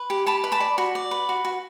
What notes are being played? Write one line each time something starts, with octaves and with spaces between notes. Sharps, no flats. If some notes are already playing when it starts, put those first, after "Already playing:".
Already playing: B4
G4
G4 A5 B5
B4
A5 B5
D5
F#4
D5
B4
F#4
F#4